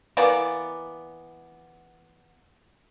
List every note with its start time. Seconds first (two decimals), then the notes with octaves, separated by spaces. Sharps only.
0.17 E3 A#3 B3 D5